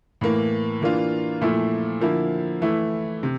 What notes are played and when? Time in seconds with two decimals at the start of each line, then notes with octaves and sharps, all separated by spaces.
0.21 A2 E3 A#3
0.81 E3 A#3 D4 F4
1.41 A#2 F3 A3 E4
2.01 D3 F3 A#3 E4
2.62 E3 A3 E4
3.23 C3